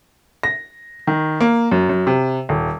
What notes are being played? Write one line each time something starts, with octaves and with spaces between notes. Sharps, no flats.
A#6
D#3
A#3
F#2
F#2
C3
D#1